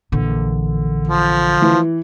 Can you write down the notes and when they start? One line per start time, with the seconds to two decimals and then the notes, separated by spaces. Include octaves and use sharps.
0.12 A#1 D3 E3
1.07 F3
1.62 E3